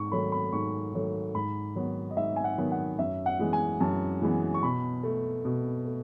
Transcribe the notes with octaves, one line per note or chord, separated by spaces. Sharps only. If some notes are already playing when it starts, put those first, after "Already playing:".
Already playing: G#2 C#6
D#3 F#3 A3 B5
B5
G#2 C#6
D#3 F#3 A3
G#2 B5
D#3 F#3 B3
D#5
G#2 E5
G#5
F#5
D#3 F#3 B3
F#5
F#2 E5
F#5
E3 G#3 B3
G#5
F#2 A5
E3 G#3 B3
C#6
B2 B5
A3
B2
A3